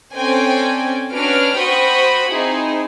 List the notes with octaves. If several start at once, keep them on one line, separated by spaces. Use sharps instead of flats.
C4 C#4 A4 D5 G5 G#5
C#4 D4 F#4 B4 F6 D7
F#4 C5 G5 B5 C#6 D#6
C4 D#4 E4 G#4